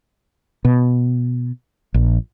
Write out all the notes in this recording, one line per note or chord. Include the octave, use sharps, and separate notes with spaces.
B2
A#1